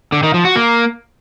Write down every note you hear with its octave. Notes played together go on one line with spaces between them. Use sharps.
D3
D#3
F3
F#4
A#3